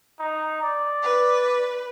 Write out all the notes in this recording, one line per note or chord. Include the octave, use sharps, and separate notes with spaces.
D#4
D5
B4